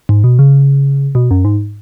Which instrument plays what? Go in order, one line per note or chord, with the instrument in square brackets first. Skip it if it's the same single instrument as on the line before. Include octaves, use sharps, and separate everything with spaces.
[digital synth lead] G#2
B2
C#3
B2
F#2
G#2